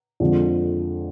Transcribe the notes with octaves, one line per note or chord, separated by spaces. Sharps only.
F2 D3 F3 G#3